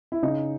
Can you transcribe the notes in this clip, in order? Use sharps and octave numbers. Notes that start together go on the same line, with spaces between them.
E4
C#3 D#4